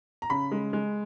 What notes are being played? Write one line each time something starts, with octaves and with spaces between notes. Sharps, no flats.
A#5
C#3 B5
G#3
G#3